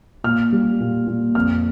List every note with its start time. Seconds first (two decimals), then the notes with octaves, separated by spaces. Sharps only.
0.24 A#2 F6
0.52 G3
0.80 A#2
1.07 A#2
1.35 F2 F6